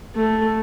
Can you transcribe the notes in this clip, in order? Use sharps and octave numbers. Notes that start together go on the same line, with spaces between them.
A3